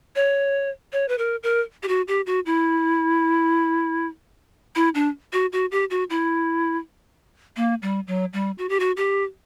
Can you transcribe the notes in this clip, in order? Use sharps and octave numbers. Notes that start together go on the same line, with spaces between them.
C#5
C#5
B4
A#4
A#4
G4
F#4
G4
F#4
E4
E4
D4
F#4
F#4
G4
F#4
E4
A#3
G3
F#3
G3
F#4
G4
F#4
G4